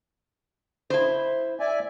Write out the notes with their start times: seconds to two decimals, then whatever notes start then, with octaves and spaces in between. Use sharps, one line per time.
0.90 E4 C5
1.60 D5 E5 G#5